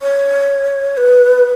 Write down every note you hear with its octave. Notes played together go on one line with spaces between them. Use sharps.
C#5
B4